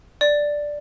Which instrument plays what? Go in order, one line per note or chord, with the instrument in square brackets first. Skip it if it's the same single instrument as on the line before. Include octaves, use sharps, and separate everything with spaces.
[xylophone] D5